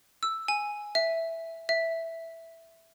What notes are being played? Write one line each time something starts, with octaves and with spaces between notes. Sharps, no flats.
E6
G#5
E5
E5